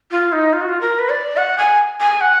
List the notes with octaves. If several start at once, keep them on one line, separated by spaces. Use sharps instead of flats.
F4
D#4
F4
F#4
F4
A#4
B4
D5
F#5
G#5
G#5
F#5